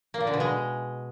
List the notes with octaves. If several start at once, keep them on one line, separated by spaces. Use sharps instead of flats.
A#3
A#2
D3
B2
G#3